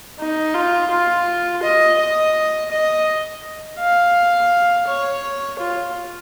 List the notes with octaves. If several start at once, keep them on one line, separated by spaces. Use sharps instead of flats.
D#4
F4
F4
D#5
D#5
D#5
F5
C#5
F4